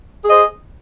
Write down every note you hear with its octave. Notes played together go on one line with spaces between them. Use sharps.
G#4 C5 D#5